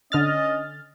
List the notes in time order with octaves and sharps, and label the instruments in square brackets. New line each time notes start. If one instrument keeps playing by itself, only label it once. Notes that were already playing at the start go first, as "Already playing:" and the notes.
[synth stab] D3 F6 A6 [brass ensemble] C#4 D#5